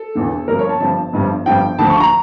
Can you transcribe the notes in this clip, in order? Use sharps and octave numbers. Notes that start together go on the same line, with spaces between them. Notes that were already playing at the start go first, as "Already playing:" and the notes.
Already playing: A4
E1 E2 D3
G1 G2 F3 A#4
C#5
A5
G1 G2 F3 A5
G1 G2 F3
G1 G2 F3 G5
D2 D3 F3 A5
C#6
A#5